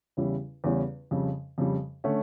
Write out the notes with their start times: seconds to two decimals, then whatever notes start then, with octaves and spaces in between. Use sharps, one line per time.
0.17 E2 C#3 G3 C#4 E4
0.64 E2 C#3 G3 C#4 E4
1.11 F2 C#3 G3
1.58 F2 C#3 G3
2.04 D3 A3 C#4